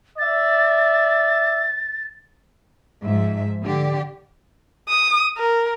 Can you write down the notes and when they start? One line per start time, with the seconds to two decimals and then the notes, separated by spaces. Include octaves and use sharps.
0.18 D5 E5 A6
3.01 G#2 F3 E5
3.63 D3 G4 D5
4.88 D#6
5.37 A#4